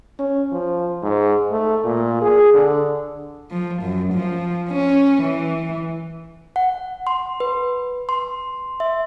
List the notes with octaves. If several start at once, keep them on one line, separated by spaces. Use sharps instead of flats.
C#4
F3
G#2
A3
A#2
G#4
D3
F3
F#2
F3
C#4
E3
F#5
C6
B4
C6
E5